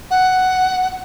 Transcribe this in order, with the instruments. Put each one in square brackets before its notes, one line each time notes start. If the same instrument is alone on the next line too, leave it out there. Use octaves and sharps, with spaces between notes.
[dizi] F#5